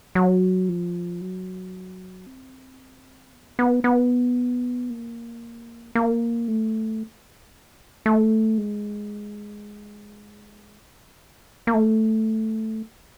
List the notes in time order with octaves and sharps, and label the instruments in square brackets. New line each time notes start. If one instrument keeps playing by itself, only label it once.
[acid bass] F#3
F3
F#3
C4
B3
B3
B3
A#3
A#3
A3
A3
G#3
A#3
A3